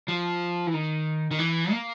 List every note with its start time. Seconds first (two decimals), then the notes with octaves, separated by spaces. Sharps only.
0.08 F3
0.67 E3
0.74 D#3
1.31 D#3
1.39 E3
1.71 A#3